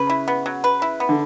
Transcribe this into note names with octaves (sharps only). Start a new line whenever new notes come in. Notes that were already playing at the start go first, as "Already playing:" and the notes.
Already playing: C#3 B4
E4
B3
F#3
B4
E4
B3
D3